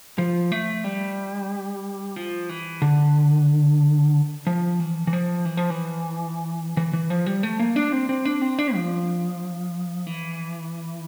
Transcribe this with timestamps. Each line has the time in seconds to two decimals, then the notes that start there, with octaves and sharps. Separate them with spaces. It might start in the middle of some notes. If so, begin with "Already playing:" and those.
0.18 F3
0.52 A3
0.84 G3
2.16 F3
2.49 E3
2.82 D3
4.47 F3
4.80 E3
5.07 E3
5.13 F3
5.45 E3
5.57 F3
5.70 E3
6.77 E3
6.93 E3
7.10 F3
7.26 G3
7.43 A3
7.59 A#3
7.76 D4
7.92 C4
8.09 C4
8.25 D4
8.42 C4
8.59 D4
8.75 F3
10.07 E3